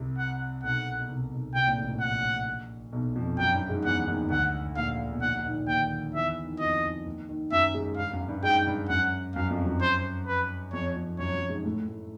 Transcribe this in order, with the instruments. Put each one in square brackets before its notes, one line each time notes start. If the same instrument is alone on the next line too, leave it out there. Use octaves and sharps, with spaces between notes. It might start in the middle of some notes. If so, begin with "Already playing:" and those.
Already playing: [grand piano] C2 C3
[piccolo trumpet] F#5
[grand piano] B1 B2 [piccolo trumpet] F#5
[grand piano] B2
C2 C3
B1 B2
[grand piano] C2 C3 [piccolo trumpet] G5
[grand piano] A#1 A#2
A1 A2
A#1 A#2
[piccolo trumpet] F#5
[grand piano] B1 B2
F2 F3
[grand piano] F#2 F#3 [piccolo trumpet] G5
[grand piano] G2 G3
G#2 G#3
[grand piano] E2 E3 [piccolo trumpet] F#5
[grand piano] D#2 D#3
[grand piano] D2 D3 [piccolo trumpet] F#5
[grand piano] A#1 A#2 [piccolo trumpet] F5
[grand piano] B2
[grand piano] A#1 A#2 [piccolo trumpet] F#5
[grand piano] A#1 A#2
D#2 D#3
[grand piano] D#2 D#3 [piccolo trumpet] G5
[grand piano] E2 E3 [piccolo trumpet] E5
[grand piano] D#3
E3
[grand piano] F2 F3 [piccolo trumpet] D#5
[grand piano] D#2 D#3
D#2 D#3
[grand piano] F#2 F#3 [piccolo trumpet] E5
[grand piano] G#2 G#3
[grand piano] G2 G3 [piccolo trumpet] F5
[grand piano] F#2 F#3
G2 G3
[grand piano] G#2 G#3 [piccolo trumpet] G5
[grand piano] G2 G3
[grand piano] F#2 F#3 [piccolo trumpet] F#5
[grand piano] F#2 F#3 [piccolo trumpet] F5
[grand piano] F2 F3
F#2 F#3
[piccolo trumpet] C5
B4
[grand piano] F2 F3 [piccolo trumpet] C#5
[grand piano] F2 F3
[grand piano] F#2 F#3 [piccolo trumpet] C#5
[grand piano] F#2 F#3
G#2 G#3
A2 A3
A2 A3